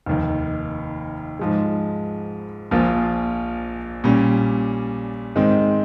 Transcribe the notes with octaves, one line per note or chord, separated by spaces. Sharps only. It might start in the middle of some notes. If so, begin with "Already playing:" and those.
F1 D#2 D#3
G#2 F3 G#3
A#1 A#2 F3 A#3 F4
A#2 G3 C#4
G#2 D#3 G#3 C4